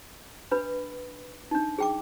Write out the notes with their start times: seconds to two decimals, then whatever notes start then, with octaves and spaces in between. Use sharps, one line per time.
0.51 D4 B4 B5
1.51 D4 D#4
1.78 G#4 G5 D6